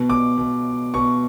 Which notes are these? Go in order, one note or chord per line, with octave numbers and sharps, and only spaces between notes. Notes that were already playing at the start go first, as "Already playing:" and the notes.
Already playing: B2
D6
B2
B2 C#6